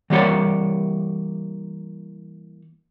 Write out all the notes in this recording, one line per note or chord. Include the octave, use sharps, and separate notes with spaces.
E3 G3 A#3 G4 C#5 D5